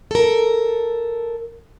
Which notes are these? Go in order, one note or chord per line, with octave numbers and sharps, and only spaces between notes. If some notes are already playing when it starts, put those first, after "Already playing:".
A4 A#4